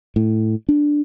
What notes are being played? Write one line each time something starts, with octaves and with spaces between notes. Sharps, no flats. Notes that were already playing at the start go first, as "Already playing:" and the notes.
A2
D4